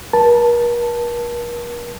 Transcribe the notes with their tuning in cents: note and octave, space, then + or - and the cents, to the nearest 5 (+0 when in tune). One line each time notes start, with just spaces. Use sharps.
A#4 +45 A5 +0